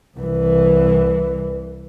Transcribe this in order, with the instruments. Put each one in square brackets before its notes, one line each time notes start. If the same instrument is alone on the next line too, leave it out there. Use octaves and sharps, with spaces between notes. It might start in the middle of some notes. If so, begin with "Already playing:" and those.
[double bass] C2 E3